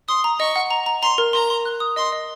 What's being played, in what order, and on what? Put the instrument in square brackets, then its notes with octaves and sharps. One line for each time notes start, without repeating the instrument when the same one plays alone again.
[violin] C6 [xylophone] D#6
[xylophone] A#5
[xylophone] D#5 [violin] C#6
[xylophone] F#5
A#5
A#5
[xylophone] A#5 [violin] C6
[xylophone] A#4
[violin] A#5 [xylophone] C6
[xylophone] C6
F#6
D#6
[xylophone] D#5 [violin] C6
[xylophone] D#5